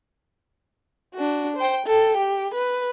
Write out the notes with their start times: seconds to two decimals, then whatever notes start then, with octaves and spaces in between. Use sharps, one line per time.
1.14 D4 F#4
1.56 C5 G5
1.86 A4 G5
2.17 G4
2.54 B4